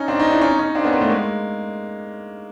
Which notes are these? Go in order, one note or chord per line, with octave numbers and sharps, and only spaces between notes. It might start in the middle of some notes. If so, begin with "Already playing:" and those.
Already playing: C#4 D#4
C4 D4
C#4 D#4
D4 E4
C#4 D#4
C#4 D#4
C4 D4
B3 C#4
A#3 C4
A3 B3
G#3 A#3